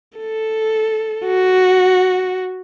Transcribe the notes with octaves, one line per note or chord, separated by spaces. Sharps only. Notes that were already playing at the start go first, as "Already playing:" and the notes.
A4
F#4